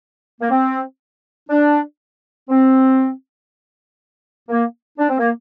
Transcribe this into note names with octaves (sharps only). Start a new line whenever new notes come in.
A#3
C4
D4
C4
A#3
D4
C4
A#3